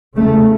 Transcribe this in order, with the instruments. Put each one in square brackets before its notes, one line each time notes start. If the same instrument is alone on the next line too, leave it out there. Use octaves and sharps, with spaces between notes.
[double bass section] E2 C#3 A3